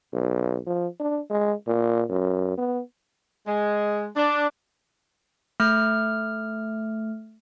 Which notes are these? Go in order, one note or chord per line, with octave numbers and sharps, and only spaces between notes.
B1
F3
D4
G#3
A#2
F#2
B3
G#3
D4
A3 F6